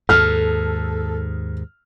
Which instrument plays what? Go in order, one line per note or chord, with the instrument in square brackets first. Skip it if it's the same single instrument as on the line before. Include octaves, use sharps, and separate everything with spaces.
[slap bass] D#2 G#2 [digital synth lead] A4 [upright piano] F6